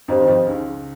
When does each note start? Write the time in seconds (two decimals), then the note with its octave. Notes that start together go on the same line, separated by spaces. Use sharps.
0.08 F2 F3 G4 C5 D#5 A#5
0.21 D#3
0.28 F2 F3
0.47 C#2 C#3 D#4